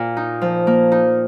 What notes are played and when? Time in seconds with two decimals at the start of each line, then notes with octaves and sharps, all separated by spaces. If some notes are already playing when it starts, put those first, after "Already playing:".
Already playing: A#2
0.17 D#4
0.41 F3
0.67 A#3
0.92 D#4